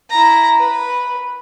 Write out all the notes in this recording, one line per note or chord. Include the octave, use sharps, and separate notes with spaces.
E4 A#5
B4